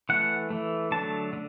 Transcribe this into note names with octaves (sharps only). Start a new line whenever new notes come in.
E3 A3 F#5
E3 A3
D3 F#3 A3 A5
D3